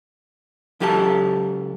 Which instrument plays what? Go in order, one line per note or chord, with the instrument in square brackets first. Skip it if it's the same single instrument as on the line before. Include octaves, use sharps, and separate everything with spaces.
[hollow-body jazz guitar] C#2 F#3 G4 A4 D5 A5